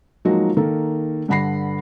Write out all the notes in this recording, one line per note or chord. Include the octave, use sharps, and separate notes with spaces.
F3 F#3 G#3 A#3 D#4 F#4
D#3 A#3 A4
G2 D3 F#5 B5 A#6 C7